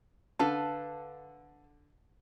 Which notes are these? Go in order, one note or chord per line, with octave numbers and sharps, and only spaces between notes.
D3 A4 B4 F5 A5